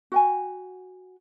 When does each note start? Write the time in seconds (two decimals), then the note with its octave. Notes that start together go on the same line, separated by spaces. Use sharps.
0.12 F#4 G5 G#5